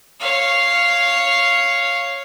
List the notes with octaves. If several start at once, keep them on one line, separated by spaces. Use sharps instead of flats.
C#5 F5